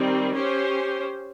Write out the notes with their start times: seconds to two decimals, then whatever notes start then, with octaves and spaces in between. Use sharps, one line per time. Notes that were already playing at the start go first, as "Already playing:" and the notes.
Already playing: D#3 G3 C4
0.34 C#4 G4 C5